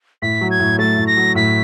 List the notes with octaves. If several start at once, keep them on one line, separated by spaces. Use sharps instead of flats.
A2 B6
F#3
G#6
A2
A3 A6
A2
A#6
F#3
A2 B6